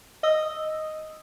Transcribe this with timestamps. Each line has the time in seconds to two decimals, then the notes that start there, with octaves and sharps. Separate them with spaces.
0.23 D#5 D#6 E6